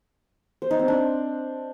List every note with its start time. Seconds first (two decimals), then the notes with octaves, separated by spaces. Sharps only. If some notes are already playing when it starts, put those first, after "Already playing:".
0.62 C5
0.71 D#4
0.79 C4
0.88 D4